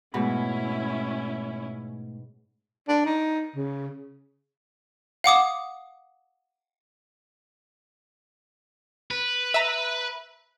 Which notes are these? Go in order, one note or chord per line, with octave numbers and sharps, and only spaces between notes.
G#2 B2 A3 C#4 E4 B5
D4
D#4
C#3
F5 F#5 D6 D#6
B4
E5 A#5